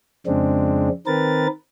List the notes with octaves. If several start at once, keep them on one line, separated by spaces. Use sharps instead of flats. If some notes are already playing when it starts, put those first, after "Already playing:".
F2 C#3 G#3 C4 D4
D#3 C4 A#4 B4 A6